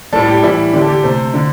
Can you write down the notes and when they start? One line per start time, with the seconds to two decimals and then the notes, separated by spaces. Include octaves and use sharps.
0.13 A2 G3 A4
0.28 G4
0.42 A2 E3 G3 E4
0.73 D3 G3 G4
0.82 A4
0.88 G4
1.03 C3 A3 C5
1.34 D3